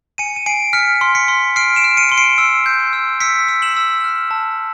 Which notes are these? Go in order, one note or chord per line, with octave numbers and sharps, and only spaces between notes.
G#5 C#7 D#7
D#7
G#5 C7 D7
F6 B6 C#7
C6
B6 C#7
C6
F6 C7 D7
D7 E7
F6
C#7 D#7
C6 C#7
C7 D7
E6
G6
E6
E6 B6 C#7
E6
E7 F#7
E6
F6
A5